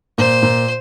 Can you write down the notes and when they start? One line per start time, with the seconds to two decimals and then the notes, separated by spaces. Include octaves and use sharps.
0.18 A#2 C5
0.42 A#2